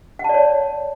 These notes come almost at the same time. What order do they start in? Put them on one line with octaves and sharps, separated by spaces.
F#5 A5 D5 C#5